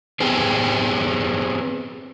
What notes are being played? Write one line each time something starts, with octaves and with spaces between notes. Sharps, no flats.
B3 C4 G4 G#4